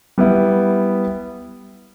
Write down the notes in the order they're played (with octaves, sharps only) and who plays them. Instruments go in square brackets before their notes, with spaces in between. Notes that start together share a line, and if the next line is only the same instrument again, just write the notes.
[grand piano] G3 B3 E4